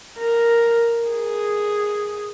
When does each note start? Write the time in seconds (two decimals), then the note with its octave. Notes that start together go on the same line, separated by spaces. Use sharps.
0.19 A#4
1.09 G#4